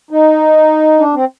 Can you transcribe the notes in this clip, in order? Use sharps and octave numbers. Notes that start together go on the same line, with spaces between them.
D#4
D4
C4